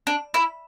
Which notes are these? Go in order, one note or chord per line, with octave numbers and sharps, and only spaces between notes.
D4
E4